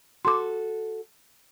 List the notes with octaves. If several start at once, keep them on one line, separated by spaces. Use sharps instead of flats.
F#4 A4 C6 D6